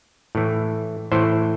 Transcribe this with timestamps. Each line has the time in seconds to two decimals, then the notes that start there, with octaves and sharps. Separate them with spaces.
0.35 A2 E3
1.12 A2 E3 C5